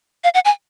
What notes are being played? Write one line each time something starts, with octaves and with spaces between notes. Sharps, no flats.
F5
F#5
G#5